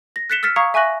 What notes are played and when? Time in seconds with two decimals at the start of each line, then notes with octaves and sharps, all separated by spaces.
0.16 A#6
0.30 F#6 A6 B6 C#7 E7 G7
0.43 E6 F6 A6 B6 C#7 E7
0.56 F5 A#5 C#6 D#6 G#6 C#7
0.74 E5 G#5 C#6 F#6 A#6 F#7